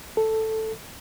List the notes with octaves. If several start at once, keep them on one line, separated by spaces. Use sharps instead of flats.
A4